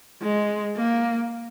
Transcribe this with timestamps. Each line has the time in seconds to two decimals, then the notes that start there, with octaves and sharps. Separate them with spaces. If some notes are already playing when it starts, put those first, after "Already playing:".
0.23 G#3
0.78 A#3